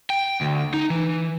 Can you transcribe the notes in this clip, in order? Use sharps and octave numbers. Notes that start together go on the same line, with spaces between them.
G5
D2
D#4
E3